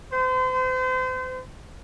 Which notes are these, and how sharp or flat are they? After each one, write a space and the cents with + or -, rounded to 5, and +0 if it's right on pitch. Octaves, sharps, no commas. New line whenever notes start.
C5 -35